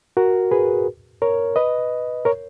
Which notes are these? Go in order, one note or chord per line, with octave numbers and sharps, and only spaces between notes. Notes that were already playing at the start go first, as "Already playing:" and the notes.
F#4 A#4
G#4 B4
A#4 C#5
B4 D#5
A#4 C#5